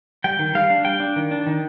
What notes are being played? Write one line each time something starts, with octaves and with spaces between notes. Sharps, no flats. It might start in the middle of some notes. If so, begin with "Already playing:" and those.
G3 G5
D#3
G3 F5
D4
G3 G5
D4
D#3
D4
D#3